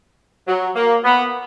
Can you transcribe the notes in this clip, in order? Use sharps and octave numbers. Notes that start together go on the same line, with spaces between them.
F#3
A#3
B3